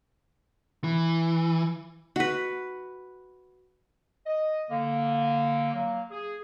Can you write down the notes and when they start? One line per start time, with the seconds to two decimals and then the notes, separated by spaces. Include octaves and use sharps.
0.84 E3
2.16 F#4 B4
4.26 D#5
4.70 D3 A#3
5.73 F#3 A#3
6.11 G#4